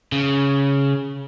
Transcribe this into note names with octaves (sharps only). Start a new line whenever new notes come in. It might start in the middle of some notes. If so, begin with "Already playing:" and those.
C#3